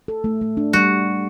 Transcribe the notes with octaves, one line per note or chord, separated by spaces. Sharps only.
A4
A3
A3
D4
G3 F#4